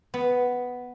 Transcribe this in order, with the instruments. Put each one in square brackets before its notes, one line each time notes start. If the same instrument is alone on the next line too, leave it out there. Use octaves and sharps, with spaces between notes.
[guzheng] B3